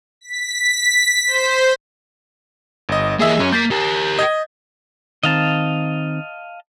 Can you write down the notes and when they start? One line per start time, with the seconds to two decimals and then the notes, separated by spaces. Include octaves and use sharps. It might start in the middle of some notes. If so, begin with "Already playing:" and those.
0.21 B6
1.27 C5
2.89 G1 D#5
3.20 E3 A#3 G#4 D#5 E5
3.40 F#2 C#4
3.53 A#3 G6 A6 B6
3.71 G4 A#4
4.19 D#5 G#6
5.23 D#3 C4 D#5 F5 A5